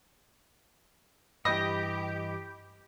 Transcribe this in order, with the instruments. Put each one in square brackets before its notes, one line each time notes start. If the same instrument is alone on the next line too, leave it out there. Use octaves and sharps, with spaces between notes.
[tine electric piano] G2 E3 [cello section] G4 [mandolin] D#5 [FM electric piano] B5 D6 G6